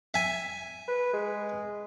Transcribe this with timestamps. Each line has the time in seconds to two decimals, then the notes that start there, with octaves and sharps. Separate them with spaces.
0.14 E5 G#5
0.88 B4
1.13 G#3